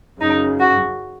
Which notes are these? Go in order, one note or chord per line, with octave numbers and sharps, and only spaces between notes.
F#2 C#3 D#4
F#4